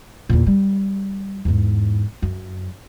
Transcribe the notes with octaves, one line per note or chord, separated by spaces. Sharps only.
E2 A#2
G3
E2 G#2
F#2